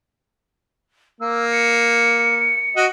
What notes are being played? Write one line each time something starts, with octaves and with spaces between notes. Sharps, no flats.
A#3 E6
C#7
F#4 D#5